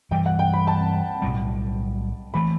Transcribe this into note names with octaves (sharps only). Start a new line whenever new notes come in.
G2 E3 G3 G5
F#5
G5
B5
A5
B1 A2 G3
E3 A3 B5